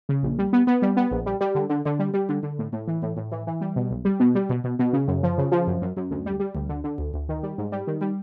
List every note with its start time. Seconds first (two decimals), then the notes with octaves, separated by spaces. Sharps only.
0.09 C#3
0.23 A#1
0.39 G3
0.53 B3
0.67 B3
0.82 G3
0.97 B3
1.11 A#1
1.26 G3
1.41 G3
1.55 D3
1.70 D3
1.85 D3
1.99 G3
2.14 G3
2.29 D3
2.43 D3
2.59 A2
2.73 A2
2.88 E3
3.02 A2
3.17 A2
3.32 E3
3.47 E3
3.61 G3
3.76 B2
3.91 B1
4.05 G3
4.20 B2
4.35 G3
4.50 B2
4.64 B2
4.79 B2
4.93 C#3
5.08 F#2
5.23 F3
5.38 C#3
5.52 F3
5.67 F#2
5.82 F#2
5.97 F#2
6.11 D2
6.26 G3
6.40 G3
6.55 D2
6.69 D3
6.84 D3
6.98 D2
7.14 D2
7.29 D#3
7.43 G3
7.58 G#2
7.72 G3
7.87 D#3
8.01 G3